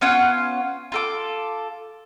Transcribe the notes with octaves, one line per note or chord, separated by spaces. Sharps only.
B3 C#4 F4 F#5
F4 A4 D6